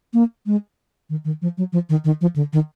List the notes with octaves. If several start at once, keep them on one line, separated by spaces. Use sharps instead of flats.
A#3
G#3
D#3
D#3
F3
F#3
F3
D#3
D#3
F3
D3
D#3